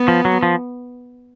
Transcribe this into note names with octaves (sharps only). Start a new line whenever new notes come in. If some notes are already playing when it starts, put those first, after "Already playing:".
Already playing: B3
F3
F#3
F3